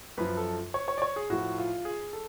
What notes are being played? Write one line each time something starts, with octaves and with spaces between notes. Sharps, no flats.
F#2 F3 B4
A4
C#5
C#5
D5
C#5
G#4
A2 F3 F#4
F4
G#4
A4